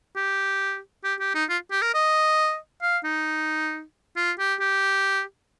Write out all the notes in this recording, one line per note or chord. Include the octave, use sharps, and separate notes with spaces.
G4
G4
G4
D#4
F4
G4
A#4
D#5
F5
D#4
F4
G4
G4